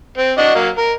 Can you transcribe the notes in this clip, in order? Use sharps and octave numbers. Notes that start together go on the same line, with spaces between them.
C4
D4 F#4 D#5
F#3 A#3
A#4